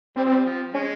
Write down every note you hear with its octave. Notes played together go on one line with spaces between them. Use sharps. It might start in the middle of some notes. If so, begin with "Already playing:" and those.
G3 C4
F3
G3
F3
G#3 C#4